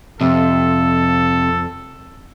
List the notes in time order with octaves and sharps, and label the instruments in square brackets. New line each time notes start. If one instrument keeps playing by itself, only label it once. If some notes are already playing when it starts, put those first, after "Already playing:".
[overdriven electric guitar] F2 [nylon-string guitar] C3 [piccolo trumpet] A4